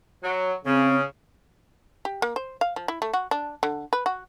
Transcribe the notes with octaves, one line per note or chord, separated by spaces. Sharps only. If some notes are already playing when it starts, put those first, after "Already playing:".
F#3
C#3 C4
G4
A#3
C5
F5
F3
E4
A3
F#4
D4
D3
B4
F#4